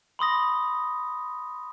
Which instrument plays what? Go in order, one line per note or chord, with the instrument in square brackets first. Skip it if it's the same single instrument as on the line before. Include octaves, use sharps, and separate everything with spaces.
[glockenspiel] B5 C6 D#6 A#6